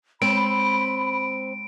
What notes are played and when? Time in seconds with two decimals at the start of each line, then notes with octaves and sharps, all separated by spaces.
0.22 G#3 C4 B5 D7